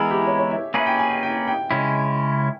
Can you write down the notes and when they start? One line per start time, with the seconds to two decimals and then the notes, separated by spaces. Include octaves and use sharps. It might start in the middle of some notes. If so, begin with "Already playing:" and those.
Already playing: E3 G#3 B3 E4 G#4 A#4
0.11 G4
0.27 C#5
0.39 C#5
0.51 E5
0.74 A#3 C#4 G#4 B4 E5
0.86 G5
0.99 G#5
1.11 G5
1.23 G5
1.47 G5
1.71 C#3 G#3 C#4 E4